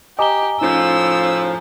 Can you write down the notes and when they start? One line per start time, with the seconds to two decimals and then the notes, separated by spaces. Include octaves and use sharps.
0.19 G4 D#5 G#5 A#5 D6 G7
0.61 A2 C#3 F3 C#4 D#4 E6